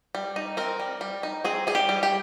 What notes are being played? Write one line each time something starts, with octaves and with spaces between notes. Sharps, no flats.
G3
D#4
C4 A#4
G3
G3
D#4
C4 G#4
G3 G#4
G4
G3
G4